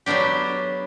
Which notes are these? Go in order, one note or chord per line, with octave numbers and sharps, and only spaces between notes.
F#3 A3 B3 D4 G4